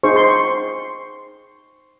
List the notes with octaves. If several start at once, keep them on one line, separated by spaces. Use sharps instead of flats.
D#4 G#4 C5 C#6
C6
C#6